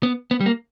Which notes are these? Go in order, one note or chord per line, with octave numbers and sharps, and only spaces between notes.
B3
B3
G3
A#3